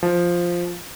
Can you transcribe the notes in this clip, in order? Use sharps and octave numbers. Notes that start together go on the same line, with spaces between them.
F3